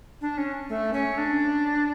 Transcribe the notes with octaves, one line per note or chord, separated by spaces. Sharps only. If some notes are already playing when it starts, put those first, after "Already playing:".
D4
C#4
A3
C#4
D4